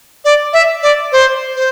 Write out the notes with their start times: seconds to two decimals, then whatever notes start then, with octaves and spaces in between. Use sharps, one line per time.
0.25 D5
0.53 E5
0.83 D5
1.12 C5
1.56 C5